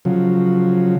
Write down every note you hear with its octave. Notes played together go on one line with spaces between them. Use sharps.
C#3 F3 F#3